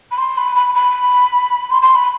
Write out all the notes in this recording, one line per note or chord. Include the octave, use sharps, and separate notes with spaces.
B5
C6
B5
B5
B5
C6
C6
B5